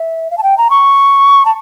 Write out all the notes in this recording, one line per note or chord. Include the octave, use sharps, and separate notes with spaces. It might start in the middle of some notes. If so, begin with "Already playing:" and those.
Already playing: E5
F5
A5
G5
A#5
C#6
A5